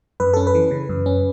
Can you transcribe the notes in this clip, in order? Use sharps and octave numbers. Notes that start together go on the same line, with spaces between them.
F#2 B4
C#4 A4
B4
E3
C#3
F#2
C#4